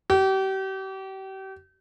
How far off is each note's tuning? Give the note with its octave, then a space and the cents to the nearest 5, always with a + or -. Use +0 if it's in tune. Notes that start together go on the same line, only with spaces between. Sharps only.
G4 -35